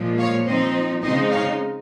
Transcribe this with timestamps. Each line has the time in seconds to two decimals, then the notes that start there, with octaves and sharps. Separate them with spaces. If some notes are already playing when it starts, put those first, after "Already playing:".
Already playing: A#2 F3 G#3
0.19 C#5 F5
0.47 F3 C4 D#4 C5 D#5
1.03 C#3 G#3 C4 D#4 C5 D#5
1.31 C#5 F5